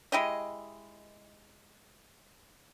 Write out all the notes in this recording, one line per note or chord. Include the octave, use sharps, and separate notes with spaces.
G#3 E4 G4 D#5